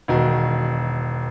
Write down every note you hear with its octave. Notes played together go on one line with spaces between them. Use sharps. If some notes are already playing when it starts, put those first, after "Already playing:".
E1 D#3 F#4